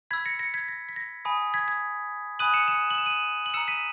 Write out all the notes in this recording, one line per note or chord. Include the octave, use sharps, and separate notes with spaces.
B5 E6 G#6 B6
A#6 C#7
A#6 C#7
G#6 B6
A#6
B6
A#6
G#5 B5 D#6
G#6 B6
G#6
G#5 B5 D#6 F#6 D#7 F#7
C#7 E7
C#7 E7
F#7
E7
D#7 F#7
F#7
A#5 E6 C#7 E7
B6 D#7